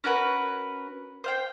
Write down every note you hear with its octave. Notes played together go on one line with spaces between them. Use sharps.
C#4 F#4 A#4 B4
C5 F5 G5